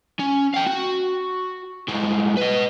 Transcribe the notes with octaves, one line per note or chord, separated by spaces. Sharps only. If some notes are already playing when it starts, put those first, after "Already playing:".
C#4
F5 G5
F#4
A2 G#3
B4 D#5